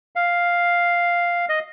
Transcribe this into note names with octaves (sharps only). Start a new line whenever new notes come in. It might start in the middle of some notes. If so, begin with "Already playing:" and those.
F5
D#5